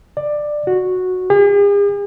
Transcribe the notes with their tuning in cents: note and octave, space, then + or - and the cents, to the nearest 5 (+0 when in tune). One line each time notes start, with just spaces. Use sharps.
D5 +15
F#4 -10
G#4 -45